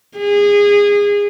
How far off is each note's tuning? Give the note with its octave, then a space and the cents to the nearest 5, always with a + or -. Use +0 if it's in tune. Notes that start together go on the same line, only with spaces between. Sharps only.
G#4 -25